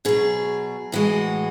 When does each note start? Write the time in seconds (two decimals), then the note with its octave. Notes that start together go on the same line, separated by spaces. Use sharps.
0.05 B2 F#3 G#4
0.92 A2 E3 G#3 F#4